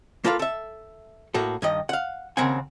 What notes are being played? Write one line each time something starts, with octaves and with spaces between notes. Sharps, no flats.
A#3 F4 A4 B4 D#5 F5
A4 E5
A2 A#3 F#4 A4
G2 D#3 D#5
F5 F#5
D#2 C#3 C4 A#4 F#5 G#5